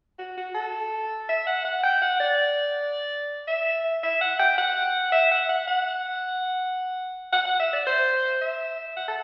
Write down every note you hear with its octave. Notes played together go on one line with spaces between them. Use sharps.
F#4
F#4
A4
E5
F#5
F#5
G5
F#5
D5
E5
E5
F#5
G5
F#5
E5
F#5
F#5
F#5
F#5
F#5
E5
D5
C5
E5
F#5
A4